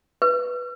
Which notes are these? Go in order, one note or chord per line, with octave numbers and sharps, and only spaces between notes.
B4